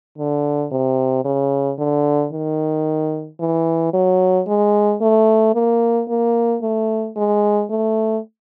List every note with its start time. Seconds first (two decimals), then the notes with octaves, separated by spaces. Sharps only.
0.18 D3
0.72 C3
1.25 C#3
1.78 D3
2.33 D#3
3.40 E3
3.93 F#3
4.48 G#3
5.02 A3
5.55 A#3
6.09 A#3
6.62 A3
7.16 G#3
7.70 A3